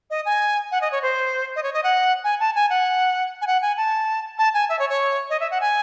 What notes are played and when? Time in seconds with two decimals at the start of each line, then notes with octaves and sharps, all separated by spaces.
0.10 D#5
0.25 G#5
0.71 F#5
0.81 D#5
0.92 C#5
1.02 C5
1.56 D#5
1.63 C#5
1.73 D#5
1.84 F#5
2.24 G#5
2.40 A5
2.55 G#5
2.70 F#5
3.41 G#5
3.47 F#5
3.62 G#5
3.77 A5
4.38 A5
4.54 G#5
4.69 E5
4.79 C#5
4.89 C#5
5.30 D#5
5.40 E5
5.51 F#5
5.61 G#5